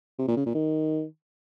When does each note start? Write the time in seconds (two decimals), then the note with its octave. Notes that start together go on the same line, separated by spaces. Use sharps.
0.19 C3
0.28 A#2
0.37 C#3
0.46 A#2
0.55 D#3